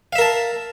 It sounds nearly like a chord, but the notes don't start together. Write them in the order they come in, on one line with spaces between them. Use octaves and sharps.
F5 E5 A#4 A5